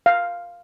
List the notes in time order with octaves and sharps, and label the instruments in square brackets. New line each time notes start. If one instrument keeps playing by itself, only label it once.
[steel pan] F5